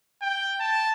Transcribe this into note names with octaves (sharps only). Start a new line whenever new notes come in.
G5
A5